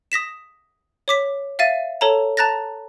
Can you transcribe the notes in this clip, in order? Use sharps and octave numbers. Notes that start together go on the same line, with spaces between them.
D#6 A#6 B6 E7
C#5 D6 B6
E5 F5 A6 D#7
A4 C#5 A5 A#5
A5 A#5 F#6 A6 A#6